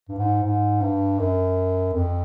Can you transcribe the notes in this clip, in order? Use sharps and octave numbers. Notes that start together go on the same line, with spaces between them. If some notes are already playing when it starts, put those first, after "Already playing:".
G2
G#2
G#2
G2
F#2
F2